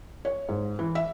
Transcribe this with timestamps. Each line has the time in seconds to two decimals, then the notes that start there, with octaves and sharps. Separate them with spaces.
0.25 C#5
0.49 G#2
0.79 E3
0.95 E5